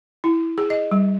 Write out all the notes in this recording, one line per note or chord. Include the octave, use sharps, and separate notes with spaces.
E4
G#4
D#5
G3